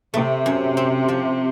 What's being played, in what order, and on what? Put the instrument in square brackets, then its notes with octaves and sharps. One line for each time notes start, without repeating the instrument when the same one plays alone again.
[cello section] C3 [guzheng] A3
[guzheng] F#2
C4
F3